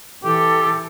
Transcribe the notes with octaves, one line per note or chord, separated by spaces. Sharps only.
E3 G4 A4